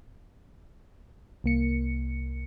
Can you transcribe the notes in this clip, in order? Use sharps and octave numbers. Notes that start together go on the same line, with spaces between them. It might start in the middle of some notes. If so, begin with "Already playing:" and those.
C2 A#3 C#7